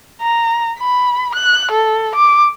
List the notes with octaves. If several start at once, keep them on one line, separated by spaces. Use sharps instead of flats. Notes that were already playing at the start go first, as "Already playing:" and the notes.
A#5
B5
F#6
A4
D6